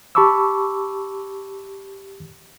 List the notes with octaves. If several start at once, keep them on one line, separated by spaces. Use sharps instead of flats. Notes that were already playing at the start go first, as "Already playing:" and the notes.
G4 A5 B5 C#6 D6 E6